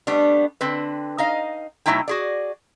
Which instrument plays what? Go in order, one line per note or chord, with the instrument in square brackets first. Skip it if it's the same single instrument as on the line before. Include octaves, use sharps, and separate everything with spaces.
[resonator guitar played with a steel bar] G3 A3 B3 D4
D3 C4 B4
D#4 D#5 F5
B2 F#3 A3 D#4 E4 G5
F#4 G#4 D5